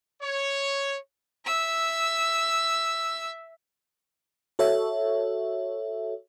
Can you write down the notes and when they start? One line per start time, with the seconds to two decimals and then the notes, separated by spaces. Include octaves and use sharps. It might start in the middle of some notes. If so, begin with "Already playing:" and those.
0.22 C#5
1.45 E5 E6
4.59 F#4 A4 C#5 E5